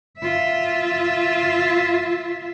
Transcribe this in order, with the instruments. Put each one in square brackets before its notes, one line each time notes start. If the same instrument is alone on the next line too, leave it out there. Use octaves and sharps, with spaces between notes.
[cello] F4 E5